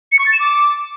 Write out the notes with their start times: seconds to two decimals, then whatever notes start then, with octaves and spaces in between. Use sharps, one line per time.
0.12 C#7
0.19 C#6
0.26 A6
0.33 E7
0.40 D6